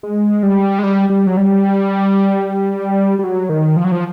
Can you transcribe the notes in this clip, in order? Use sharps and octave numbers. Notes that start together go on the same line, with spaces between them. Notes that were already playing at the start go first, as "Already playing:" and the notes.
G#3
G3
G#3
G3
G3
F#3
G3
G3
F#3
D#3
F3
F#3
F3